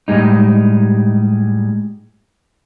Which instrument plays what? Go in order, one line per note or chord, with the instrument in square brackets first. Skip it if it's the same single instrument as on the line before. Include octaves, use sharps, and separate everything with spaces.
[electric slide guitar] A2 G3 G#3 D#4